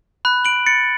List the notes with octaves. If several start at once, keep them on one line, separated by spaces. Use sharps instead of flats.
B5 F#6
D7 F#7
A6 C#7